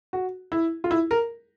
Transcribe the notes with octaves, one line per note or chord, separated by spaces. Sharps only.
F#4
E4
F4
E4
A#4